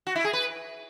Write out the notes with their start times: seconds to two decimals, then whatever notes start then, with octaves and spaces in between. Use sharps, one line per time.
0.07 F#4
0.15 E4
0.24 G#4
0.33 B4